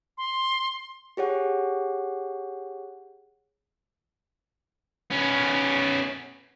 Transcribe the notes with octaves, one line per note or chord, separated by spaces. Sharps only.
C6
G4 G#4 C#5 F#5
B3 C#4